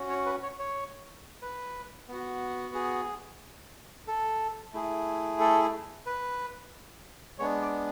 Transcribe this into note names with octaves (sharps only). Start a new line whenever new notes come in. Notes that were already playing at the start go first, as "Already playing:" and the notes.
Already playing: C#4 F#4
C#5
B4
C#5
C#5
B4
B3 F#4
G#4
A4
A3 E4 G#4
A4
B4
G#3 B3 D4 C#5
D5